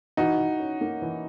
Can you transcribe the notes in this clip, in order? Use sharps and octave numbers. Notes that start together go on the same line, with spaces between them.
E3 D#4 F#4
E3
C#4
A#3
E3